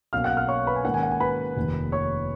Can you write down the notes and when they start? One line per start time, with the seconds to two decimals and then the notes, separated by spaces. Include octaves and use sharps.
0.13 B1 B2 A#3 C#4 F5 F6
0.24 F#5 F#6
0.37 F5 F6
0.48 C#5 C#6
0.67 B4 B5
0.76 G#5
0.84 G#2 D#3 A#3 C#4 F#5
0.94 G#5
1.03 F#5
1.11 G#5
1.20 B4 B5
1.56 F1 D#2 D#3
1.92 C#5 C#6